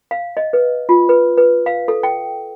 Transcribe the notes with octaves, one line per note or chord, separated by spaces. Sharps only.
F5
D#5
B4
F4
B4
B4
F5
A4
G5